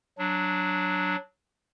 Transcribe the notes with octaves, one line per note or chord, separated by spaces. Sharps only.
F#3 D4